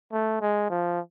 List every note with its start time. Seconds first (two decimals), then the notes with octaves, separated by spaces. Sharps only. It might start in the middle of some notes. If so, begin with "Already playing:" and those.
0.12 A3
0.41 G#3
0.70 F3